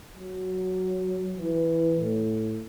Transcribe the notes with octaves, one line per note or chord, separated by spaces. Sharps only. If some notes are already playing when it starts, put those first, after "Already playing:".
F#3
E3
A2